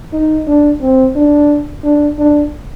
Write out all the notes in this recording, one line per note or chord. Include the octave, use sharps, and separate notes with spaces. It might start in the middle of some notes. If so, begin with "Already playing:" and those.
D#4
D4
C4
D4
D4
D4